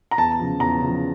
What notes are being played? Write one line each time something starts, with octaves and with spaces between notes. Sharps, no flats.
A#5
E2 A5
C#3 F3
E2 A#5
C#3 F3